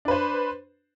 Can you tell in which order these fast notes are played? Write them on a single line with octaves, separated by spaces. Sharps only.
D4 B4 C5